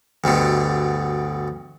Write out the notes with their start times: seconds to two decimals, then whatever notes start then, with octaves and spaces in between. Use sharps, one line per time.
0.24 D2 G2 B2 D3